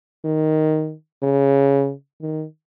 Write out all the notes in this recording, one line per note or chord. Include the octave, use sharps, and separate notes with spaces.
D#3
C#3
D#3